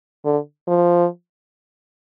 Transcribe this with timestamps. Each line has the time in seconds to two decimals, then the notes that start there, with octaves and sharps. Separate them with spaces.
0.25 D3
0.67 F3